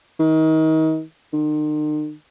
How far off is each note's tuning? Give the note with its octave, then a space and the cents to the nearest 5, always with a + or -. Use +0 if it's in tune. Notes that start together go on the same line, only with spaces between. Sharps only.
D#3 +30
D#3 -45